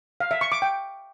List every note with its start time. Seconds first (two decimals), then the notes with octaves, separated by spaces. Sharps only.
0.20 F5
0.31 E5
0.41 C#6
0.52 D6
0.62 G5